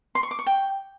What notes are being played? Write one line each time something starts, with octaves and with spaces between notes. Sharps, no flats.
C6
C#6
D6
C#6
G5